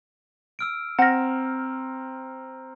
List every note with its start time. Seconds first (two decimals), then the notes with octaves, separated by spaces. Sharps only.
0.59 E6 F6 D7
0.99 C4 F#5 A#5 F6 A#6